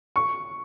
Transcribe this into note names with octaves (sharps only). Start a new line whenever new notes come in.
C#6